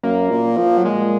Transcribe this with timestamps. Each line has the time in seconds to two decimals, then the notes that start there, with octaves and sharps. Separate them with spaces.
0.03 F#2 A#3
0.30 A#2
0.58 F3
0.77 F#3
0.85 A#2 G#3